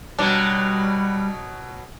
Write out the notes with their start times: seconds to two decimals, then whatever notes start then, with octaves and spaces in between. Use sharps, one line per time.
0.19 B2 F#3 G3 D4